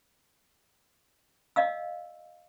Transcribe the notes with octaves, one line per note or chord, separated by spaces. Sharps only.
D5 D#5 F5 E6